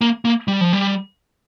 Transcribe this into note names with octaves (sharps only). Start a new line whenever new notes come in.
A#3
A#3
G3
F3
G3